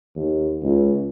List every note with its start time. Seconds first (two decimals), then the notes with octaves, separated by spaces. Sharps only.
0.16 D#2
0.62 C#2